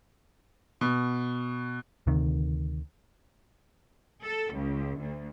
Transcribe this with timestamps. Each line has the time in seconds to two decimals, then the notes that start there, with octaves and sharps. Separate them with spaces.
0.81 B2
2.07 D2 C3 D#3
4.24 A4
4.53 C#2
5.00 D2